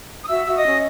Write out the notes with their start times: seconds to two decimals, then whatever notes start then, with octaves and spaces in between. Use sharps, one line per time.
0.23 D#6
0.27 F#4 E5 E6
0.44 F#4 E6
0.56 D#5 D#6
0.64 C#4